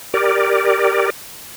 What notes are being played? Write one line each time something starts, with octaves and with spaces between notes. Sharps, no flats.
G4 A#4 D5